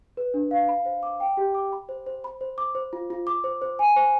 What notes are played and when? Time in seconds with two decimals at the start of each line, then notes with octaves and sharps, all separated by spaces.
0.17 B4
0.34 D4
0.51 F5
0.69 B5
0.85 C5
1.03 D6
1.20 G5
1.37 G4
1.55 D6
1.72 B5
1.89 C5
2.06 C5
2.24 B5
2.41 C5
2.58 D6
2.75 C5
2.93 F4
3.10 F4
3.27 D6
3.44 C5
3.62 C5
3.79 G#5
3.96 C5